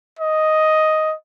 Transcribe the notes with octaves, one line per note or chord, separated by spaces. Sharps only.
D#5